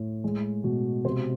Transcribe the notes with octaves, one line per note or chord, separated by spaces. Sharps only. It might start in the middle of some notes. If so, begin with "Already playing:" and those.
Already playing: A2
G#3
B2
C3 C5